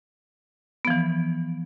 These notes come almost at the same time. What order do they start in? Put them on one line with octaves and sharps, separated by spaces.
B3 F3 E3